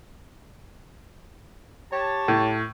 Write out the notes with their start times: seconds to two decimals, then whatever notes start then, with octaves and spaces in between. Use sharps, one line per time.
1.91 G4 C#5 A5
2.28 A2